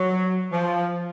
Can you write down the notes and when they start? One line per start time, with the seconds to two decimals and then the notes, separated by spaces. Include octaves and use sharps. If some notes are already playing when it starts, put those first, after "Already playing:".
Already playing: F#3
0.52 F3